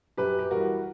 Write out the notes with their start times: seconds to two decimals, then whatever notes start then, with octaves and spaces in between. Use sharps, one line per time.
0.17 F#2 G4 B4
0.39 G4
0.51 E3 G3 F#4 A#4